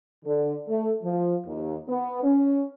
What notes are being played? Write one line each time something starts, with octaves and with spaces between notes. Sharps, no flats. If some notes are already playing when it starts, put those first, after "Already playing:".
D3
A3
F3
D#2
B3
C#4